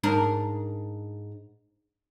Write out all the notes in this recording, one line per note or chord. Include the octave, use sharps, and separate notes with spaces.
G#2 D4 A#4